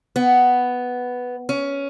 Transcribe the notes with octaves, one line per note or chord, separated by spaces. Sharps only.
B3
C#4